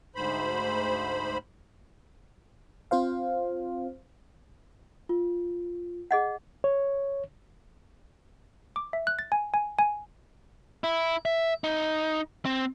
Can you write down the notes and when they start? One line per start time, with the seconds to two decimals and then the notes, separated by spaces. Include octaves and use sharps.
0.15 D2 G#2 C5 B5
2.91 C4 F4 C5 F5
5.09 F4
6.11 G#4 D#5 F#5
6.64 C#5
8.76 D6
8.93 E5
9.07 F#6
9.19 A6
9.32 G#5
9.54 G#5
9.79 G#5
10.84 E4
11.25 E5
11.64 D#4
12.45 C4